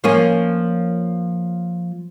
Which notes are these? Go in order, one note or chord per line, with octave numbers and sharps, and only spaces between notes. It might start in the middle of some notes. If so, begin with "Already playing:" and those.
F3 A#3 C#4